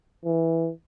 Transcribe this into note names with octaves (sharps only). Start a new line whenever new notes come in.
E3